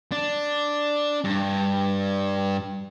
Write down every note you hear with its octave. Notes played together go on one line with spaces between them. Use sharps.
D4
G2